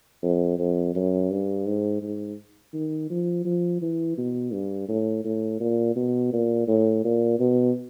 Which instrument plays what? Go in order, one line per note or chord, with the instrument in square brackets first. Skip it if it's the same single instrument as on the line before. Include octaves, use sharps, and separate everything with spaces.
[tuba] F2
F2
F#2
G2
G#2
G#2
D#3
F3
F3
E3
B2
G2
A2
A2
A#2
B2
A#2
A2
A#2
B2